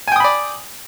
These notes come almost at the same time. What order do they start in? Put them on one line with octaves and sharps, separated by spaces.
G#5 G5 D#6 B5 D5